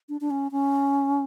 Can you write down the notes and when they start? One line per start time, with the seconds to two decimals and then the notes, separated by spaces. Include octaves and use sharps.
0.09 D4
0.21 D4
0.30 C#4
0.52 C#4